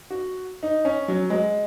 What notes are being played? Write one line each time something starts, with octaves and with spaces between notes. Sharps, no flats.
F#4
D#4
C#4
F#3
G#3